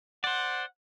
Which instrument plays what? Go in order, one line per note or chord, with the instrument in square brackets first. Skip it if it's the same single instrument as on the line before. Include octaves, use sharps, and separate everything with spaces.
[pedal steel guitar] C5 D5 [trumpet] F#5